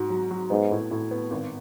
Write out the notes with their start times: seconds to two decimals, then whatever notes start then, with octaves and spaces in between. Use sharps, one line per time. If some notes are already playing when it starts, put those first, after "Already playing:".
Already playing: G#2 F#4
0.10 F#3
0.31 F#3
0.50 G#2 B3
0.71 A2
0.91 A2
1.11 B3
1.31 G#1